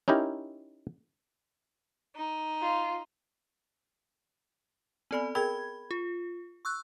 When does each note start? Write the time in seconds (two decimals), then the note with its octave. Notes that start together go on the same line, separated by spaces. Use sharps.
0.08 C#4 D#4 E4 G4 A#4
2.16 D#4
2.62 F4
5.11 B3 C4 A4 D5 G#5 B5
5.35 G#4 A#4 G5 B5 G#6
5.91 F4
6.65 C#6 E6 F#6